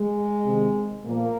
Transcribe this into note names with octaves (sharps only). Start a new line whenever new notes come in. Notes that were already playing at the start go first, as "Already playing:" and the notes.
Already playing: G#3
C3 D#3
A#2 F3 A#3